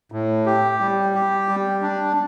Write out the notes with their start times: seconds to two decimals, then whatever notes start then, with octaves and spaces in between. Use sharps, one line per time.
0.12 A2
0.46 G4
0.80 G3
1.15 G4
1.48 G3
1.82 D4